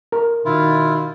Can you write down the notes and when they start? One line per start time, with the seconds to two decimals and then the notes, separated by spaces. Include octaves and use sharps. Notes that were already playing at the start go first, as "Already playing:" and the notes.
0.12 A#4
0.45 B2 D#3 E4 F4